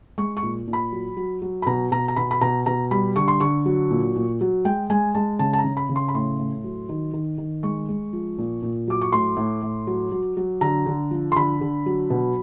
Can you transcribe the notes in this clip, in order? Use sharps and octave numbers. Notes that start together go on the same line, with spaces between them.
G#3 C#6
C#6
A#2
A#2
B5
F#3
F#3
F#3
B5
B2 A#5
B2 A#5
A#5
B2 B5
B5
B2 A#5
B2 A#5
G3 B5
D3 C#6
C6
D3 C#6
F#3
A#2
A#2
F#3
G#3 G5
G#3 G#5
G#3 A5
C#3 A5
A5
A#5
C#3
B5
C#3
C6
B5
A2 C6
A2
F#3
D#3
D#3
D#3
G#3 C#6
G#3
F3
A#2
A#2
F#3 D6
C#6
A2 C6
A2
A2
F#3
F#3
F#3
D3 A#5
D3
F3
C6
D3 B5
D3
F#3
B2